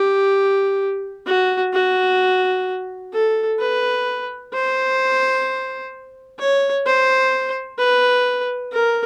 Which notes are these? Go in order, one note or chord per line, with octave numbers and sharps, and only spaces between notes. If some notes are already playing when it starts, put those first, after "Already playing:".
Already playing: G4
F#4
F#4
A4
B4
C5
C#5
C5
B4
A#4